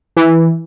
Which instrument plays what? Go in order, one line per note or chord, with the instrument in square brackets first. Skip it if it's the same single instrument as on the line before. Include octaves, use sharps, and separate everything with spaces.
[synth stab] E3